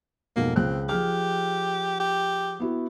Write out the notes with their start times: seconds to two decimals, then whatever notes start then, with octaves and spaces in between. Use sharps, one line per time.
0.36 F2 G#2 B2 A#3
0.56 C#2 C4 F#6
0.89 F3 G4 G#4 F6
2.00 G4
2.60 B3 E4 F#4